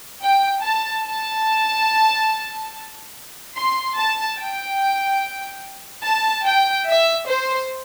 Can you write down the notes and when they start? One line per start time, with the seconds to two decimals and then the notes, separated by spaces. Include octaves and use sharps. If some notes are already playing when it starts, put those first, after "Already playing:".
0.22 G5
0.63 A5
1.05 A5
3.54 C6
3.96 A5
4.38 G5
6.03 A5
6.44 G5
6.87 E5
7.28 C5